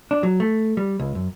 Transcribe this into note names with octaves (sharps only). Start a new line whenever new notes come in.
D4
F#3
A3
G3
C#2
F#2